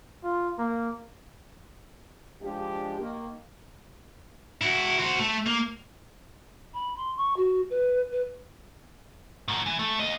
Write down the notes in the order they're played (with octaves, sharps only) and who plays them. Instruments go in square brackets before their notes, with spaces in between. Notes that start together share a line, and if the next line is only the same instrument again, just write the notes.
[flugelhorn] F4
A#3
[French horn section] F3 G#3 D4 G4
D#3 A#3
[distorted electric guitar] E4 F#4
F#4 C5
A3
A#3
[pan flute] B5
C6
C#6
F#4
B4
B4
[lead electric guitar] A2 F#3
E3
A3
D#2 D#5